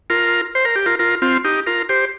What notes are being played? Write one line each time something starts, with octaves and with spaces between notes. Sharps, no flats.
F4 A#4
C5
A#4
G4
F4 A#4
F4 A#4
C4 F4
D#4 G4
F4 A#4
G4 C5